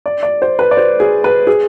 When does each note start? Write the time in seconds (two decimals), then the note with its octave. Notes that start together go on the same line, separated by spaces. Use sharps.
0.06 D5
0.23 D5
0.42 C5
0.59 B4
0.71 D5
0.77 C5
1.00 G#4
1.24 B4
1.47 G#4